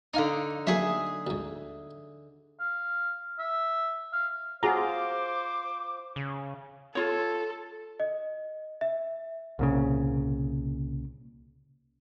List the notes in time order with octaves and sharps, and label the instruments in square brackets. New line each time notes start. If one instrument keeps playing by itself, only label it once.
[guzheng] D3 D#4 [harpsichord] F5 G#5 D6
[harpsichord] F#3 A3 A#3 [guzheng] G#4 E5
[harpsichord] D2 G#2
[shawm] F5
E5
F5
[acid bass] F4 [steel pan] F#4 G#4 A#5 [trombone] C5 [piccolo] D6
[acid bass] C#3
[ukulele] F4 C#5 [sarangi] A4
[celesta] D#5
E5
[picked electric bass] C2 A#2 C#3